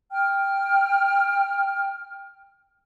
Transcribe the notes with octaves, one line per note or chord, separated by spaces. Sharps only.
G5 F6